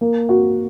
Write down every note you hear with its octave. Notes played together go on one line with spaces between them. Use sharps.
A#3
F#4